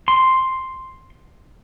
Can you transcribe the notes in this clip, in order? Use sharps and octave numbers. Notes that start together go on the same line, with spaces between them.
C6